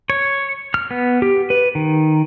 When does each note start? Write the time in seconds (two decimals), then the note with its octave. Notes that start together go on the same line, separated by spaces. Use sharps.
0.10 C#5
0.74 F6
0.91 B3
1.22 G4
1.50 B4
1.75 D#3